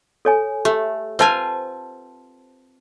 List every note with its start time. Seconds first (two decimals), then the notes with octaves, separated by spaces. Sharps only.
0.25 A4 C#5 G#5
0.65 A3 G4
1.19 C4 F4 B4 C5 G#5 A5